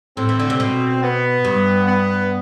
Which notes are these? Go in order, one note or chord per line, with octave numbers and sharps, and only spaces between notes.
A2 C4
E3
D3
C3
B2
B3
G2
B3